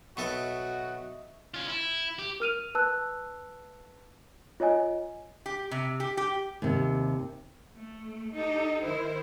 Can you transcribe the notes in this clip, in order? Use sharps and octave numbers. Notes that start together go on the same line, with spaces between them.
B1 B3 F#4 A4 D#5 E5 C#6
C#4 F4
E4
G4
A#4 F6 D#7 F7
B4 A5 E6 F#6
F4 C#5 D#5 G#5
G4
C3
G4
G4
D#2 C3
A3
D#4 G4 A4
D#3 E4 A#4 C5